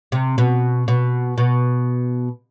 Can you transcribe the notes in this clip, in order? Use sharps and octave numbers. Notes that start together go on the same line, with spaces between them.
C3
B2
B2
B2